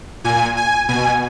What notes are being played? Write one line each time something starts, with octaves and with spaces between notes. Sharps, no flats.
A#2 G#5
G#5
B2 G#5